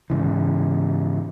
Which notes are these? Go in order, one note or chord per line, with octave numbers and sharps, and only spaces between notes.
G#2 C#3 E3